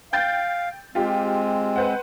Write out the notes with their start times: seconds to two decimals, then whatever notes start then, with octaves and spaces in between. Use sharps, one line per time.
0.13 F5 G5 G6 A6
0.95 G#3 C4 F4 G4
1.76 B4 C5 F#5